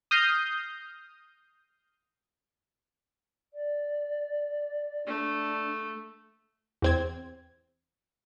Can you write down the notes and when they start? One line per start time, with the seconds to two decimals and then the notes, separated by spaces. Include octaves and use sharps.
0.11 D#6 F6 G6 A#6 C7
3.54 D5
5.07 A3 D4
6.82 E2 C4 G#6